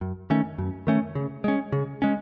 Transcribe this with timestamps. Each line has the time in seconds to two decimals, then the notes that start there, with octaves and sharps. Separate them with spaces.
0.01 F#2
0.30 D#3 A3 C#4
0.58 F#2
0.87 D#3 A3 C#4
1.15 C#3
1.44 G#3 C#4
1.72 C#3
2.02 G#3 C#4